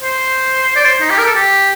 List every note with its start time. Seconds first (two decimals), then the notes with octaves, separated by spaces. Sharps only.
0.01 C5
0.76 D5
0.85 C5
1.01 D#4
1.10 G4
1.18 A#4
1.26 A4
1.35 G4